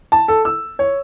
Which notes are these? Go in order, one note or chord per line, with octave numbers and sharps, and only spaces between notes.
A5
A4
E6
C#5